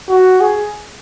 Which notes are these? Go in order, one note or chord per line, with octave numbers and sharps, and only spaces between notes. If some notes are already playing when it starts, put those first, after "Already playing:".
F#4
G#4